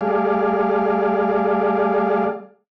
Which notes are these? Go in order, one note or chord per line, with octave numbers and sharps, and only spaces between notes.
G3 A3 G#4 D5 F5